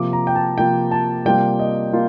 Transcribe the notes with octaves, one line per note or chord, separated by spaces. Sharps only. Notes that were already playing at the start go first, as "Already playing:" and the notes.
Already playing: C3 F3 A#3 F4 D6
A#5
G5
A5
C3 F3 A#3 F4 G5
A5
C3 G3 A#3 F4 G5
D#5
A#3 F4